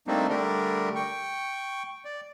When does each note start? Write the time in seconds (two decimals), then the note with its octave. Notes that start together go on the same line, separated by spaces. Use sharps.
0.07 G3 A3 A#3 C4 D4 D#4
0.29 D3 G3 A3 D4 G4 A#4
0.95 G5 C#6
2.05 D5